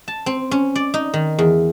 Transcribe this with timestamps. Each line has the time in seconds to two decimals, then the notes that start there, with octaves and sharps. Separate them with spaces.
0.08 A5
0.26 C4
0.51 C#4
0.75 D5
0.94 D#4
1.14 D#3
1.39 E2